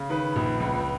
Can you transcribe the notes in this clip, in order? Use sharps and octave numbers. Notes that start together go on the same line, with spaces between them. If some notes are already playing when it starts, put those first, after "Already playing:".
Already playing: C#3
D#3 B4
A#1
C#2